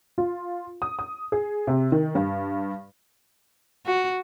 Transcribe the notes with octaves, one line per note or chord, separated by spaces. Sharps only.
F4
D#6
D#6
G#4
C3
D#3
G2
F#4